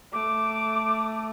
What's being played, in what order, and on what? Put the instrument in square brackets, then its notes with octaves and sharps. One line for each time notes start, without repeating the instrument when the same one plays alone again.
[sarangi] A3 [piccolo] D6